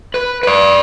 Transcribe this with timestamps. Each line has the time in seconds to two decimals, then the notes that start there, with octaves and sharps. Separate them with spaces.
0.14 B4
0.43 B4 D5